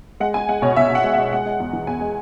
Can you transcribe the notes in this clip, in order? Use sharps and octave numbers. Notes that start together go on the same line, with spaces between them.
G#3 F#5
G#3 G#5
G#3 F#5
B2 C#5
B2 E5
B2
F#5
G#3
E5
G#3
G#3 F#5
G#3
E2
E3
E2 G#5
G#3